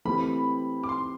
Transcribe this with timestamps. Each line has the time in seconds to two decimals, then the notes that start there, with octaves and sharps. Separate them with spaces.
0.05 E3 A3 C4 G4 B5
0.83 D6
0.89 C6